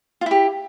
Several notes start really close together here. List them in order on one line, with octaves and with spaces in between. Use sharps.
F4 E4 G4